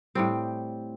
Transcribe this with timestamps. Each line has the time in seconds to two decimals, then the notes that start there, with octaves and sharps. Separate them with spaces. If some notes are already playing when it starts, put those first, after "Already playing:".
0.15 A2 G3 C4